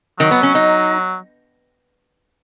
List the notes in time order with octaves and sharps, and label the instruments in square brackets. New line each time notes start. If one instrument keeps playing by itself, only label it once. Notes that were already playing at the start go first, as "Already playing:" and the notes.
[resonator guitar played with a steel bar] D#3 [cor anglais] F#3
[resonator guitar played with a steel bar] B3
C#4
D#4